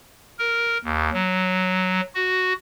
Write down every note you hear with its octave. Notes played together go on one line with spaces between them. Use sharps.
A#4
D#2
F#3
F#4